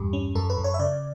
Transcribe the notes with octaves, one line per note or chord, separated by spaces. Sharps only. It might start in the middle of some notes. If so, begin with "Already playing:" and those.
Already playing: E2 G2 G4
C#4
F#2 A4
B4
F#2
C#5
E5
C#3 D5